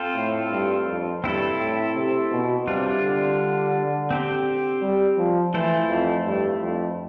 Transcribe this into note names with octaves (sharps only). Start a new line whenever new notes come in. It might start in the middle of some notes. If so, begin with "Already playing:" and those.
Already playing: C4 F4 A4 C5
A2
G2
F2
G2 C4 E4 A4
A2
C3
B2
C3 G3 D4 F4
D3
C4 G4 C5
G3
F3
E3 A3 E4 A4 C5
F2
G2
F2